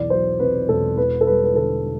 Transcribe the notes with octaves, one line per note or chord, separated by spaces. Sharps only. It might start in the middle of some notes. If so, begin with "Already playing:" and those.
Already playing: B1 E2 D5
F#3 C5
C3 B4
E1 A4
E2 B4
A4
G3 B4
B4
D3 A4